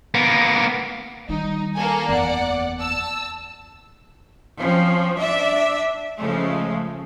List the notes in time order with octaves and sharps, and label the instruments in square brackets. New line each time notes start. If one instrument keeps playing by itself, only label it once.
[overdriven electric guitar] A#3 B3
[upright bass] D#3 G3 [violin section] D#4
[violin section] A#3 A4 G#5
[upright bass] F#1 E2 [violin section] D5 F#5
[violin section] A5 E6
[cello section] F3 C4 C#4
D4 D5 E5
C#3 F3 G#3 A3